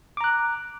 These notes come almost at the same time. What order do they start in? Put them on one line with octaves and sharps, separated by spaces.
D6 A#5 F#6